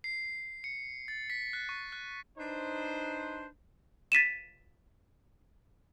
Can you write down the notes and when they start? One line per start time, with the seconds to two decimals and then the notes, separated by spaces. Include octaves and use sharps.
0.04 C7
0.64 C#7
1.08 A6
1.30 B6
1.53 F#6
1.69 C#6
1.92 F#6
2.38 D4 D#4 B4 C5
4.12 A6 B6 D#7 E7